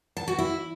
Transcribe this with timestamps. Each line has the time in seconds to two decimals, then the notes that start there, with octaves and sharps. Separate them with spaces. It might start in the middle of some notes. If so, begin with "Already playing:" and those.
0.17 A5
0.28 F#4
0.39 E4